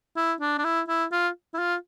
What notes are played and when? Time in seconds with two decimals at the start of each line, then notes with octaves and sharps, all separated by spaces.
0.17 E4
0.41 D4
0.58 D4
0.65 E4
0.88 E4
1.12 F4
1.54 E4
1.58 F4